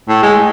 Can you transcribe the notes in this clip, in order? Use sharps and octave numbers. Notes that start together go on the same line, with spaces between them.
A2
G#3